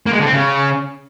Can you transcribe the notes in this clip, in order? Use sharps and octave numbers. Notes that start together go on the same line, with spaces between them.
A#3
G#3
D3
C4
C#3